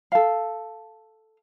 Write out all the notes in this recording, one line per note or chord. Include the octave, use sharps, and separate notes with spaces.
A4 F5